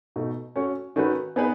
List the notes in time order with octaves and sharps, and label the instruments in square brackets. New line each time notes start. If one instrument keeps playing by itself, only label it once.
[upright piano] B2 A3 D#4
A3 C#4 F#4 C#5
D#3 A3 C#4 F#4 B4
B3 D#4 G#4 B4